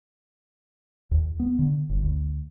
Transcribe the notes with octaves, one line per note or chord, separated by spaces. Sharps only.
D#2
B3
D3
G1
D2